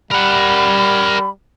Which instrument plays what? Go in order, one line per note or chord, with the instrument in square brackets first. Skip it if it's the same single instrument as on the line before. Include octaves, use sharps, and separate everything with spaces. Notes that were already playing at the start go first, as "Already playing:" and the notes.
[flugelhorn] G3 [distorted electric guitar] A#4 F#5 [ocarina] B5